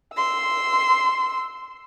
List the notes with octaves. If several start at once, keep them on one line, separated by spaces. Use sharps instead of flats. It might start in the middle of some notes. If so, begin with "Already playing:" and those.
C6 E6